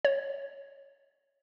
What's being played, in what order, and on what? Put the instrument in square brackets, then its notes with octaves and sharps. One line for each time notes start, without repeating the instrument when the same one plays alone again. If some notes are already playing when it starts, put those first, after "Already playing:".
[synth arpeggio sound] C#5